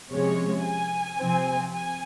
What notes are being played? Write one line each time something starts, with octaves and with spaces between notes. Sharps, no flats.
C3 F3 G#3 C#4 C#5
G#5
C3 F3 C4
G#5